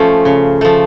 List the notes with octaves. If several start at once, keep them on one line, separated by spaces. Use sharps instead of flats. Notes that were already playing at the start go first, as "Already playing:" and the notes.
Already playing: F3 A3 C#4
C#3
F3 A3